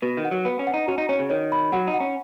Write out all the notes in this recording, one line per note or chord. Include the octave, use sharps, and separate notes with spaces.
B2 B4
D#3
F#5
F#3
B3 B4
C#4
F#5
D#4
C#4 F#4
D#4
C#4 C#5
C#3
D#3 C#5
B5
F#3 F#5
D#4
F#5
C#4